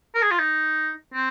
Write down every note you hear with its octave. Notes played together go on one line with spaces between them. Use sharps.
A#4
G#4
F4
D#4
C4